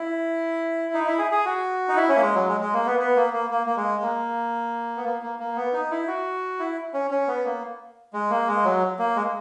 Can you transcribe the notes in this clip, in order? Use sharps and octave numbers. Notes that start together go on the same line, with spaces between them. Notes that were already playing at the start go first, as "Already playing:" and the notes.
Already playing: E4
D#4
E4
G#4
G#4
F#4
D#4
E4
C#4
A#3
G#3
F#3
G#3
G#3
A#3
B3
B3
A#3
A#3
A#3
A#3
G#3
A#3
B3
A#3
A#3
A#3
B3
D#4
E4
F#4
E4
C#4
C#4
B3
A#3
G#3
A#3
G#3
F#3
A#3
G#3